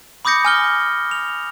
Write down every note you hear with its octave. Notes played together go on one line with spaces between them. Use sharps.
B5 D6 D#6 G6 A#6 C#7
G#5 F6 G7
F7